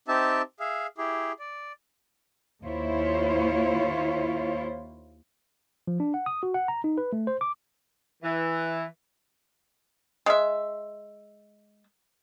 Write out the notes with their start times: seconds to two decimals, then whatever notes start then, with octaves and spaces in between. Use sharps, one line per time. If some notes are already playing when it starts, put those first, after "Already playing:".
0.08 C4 D#4 G4 E5 A5
0.60 G#4 E5 F5
0.98 E4 G4 G#4
1.39 D5
2.64 D#2 E4 F4 C5 C#5
5.87 F3
6.00 D4
6.14 F#5
6.26 D#6
6.43 F#4
6.54 F#5
6.68 A#5
6.84 D#4
6.98 B4
7.13 A3
7.27 C5
7.41 D6
8.23 E3
10.26 G#3 E5